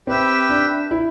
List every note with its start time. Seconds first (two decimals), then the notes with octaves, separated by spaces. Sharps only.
0.07 C4 G4 B4 E5 G5
0.49 D4
0.91 E4